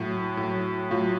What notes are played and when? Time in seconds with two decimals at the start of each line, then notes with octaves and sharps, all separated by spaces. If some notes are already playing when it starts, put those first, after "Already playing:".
Already playing: A2 F#3 F#4
0.37 A2 F#3
0.91 A2 F#3 F4